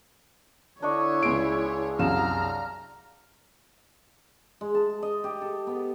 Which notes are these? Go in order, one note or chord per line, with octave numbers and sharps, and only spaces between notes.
D3 D4 E4 C#5 D#5 C#6
C#2 G#4 C6 D7
C2 F#2 F5 A#5 F6 E7
G#3
A5
D#5
G4
A4
B3